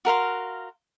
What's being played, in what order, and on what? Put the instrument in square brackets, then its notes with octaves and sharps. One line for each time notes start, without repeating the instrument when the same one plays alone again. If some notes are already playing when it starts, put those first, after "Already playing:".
[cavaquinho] F#4 A#4 F5 C6